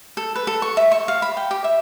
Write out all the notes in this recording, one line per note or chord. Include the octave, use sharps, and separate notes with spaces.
A4
B4
A4
C#6
E5
C#6
F5
B5
G5
G4
E5